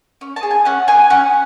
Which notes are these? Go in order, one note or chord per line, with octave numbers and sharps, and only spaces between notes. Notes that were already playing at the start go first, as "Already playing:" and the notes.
C#4
A5
G#4
G#5
C#4 F#5
G#4 G#5
C#4 F#5